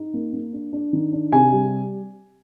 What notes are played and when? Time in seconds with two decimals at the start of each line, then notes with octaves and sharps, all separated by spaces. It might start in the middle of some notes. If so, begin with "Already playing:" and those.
Already playing: D#4
0.14 A#3
0.33 A#3
0.53 D4
0.73 D4
0.93 D#3
1.13 D4
1.32 C3 G#5
1.52 G3